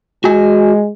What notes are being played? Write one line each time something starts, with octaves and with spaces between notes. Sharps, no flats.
G#3 F#4 G#5